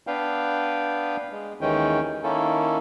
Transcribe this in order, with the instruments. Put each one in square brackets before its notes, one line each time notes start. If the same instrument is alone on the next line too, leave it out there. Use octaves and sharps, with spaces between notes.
[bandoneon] B3 D4 B4 F5 G5
G#3
D#2 D#3 E3 G#3 C#4 G5
D#3 A#3 C#4 E4 A4